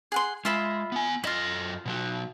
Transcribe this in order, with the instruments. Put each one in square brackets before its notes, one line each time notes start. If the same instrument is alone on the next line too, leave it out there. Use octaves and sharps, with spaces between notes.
[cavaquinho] G#4 F#5 C6
[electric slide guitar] G#3 [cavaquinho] F4 E5 B5
[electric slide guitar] B3 G#5
[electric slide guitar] F#2 A4 D#5 [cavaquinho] E4 F4
[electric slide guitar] B2 F#3 F#4